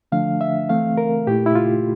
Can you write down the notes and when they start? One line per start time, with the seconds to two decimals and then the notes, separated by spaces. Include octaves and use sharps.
0.12 D3 F3 A3 D4 F5
0.41 E5
0.69 E3 A3 C4 F5
0.97 A#4
1.27 A#2 A3 E4 G4
1.46 E4
1.55 F4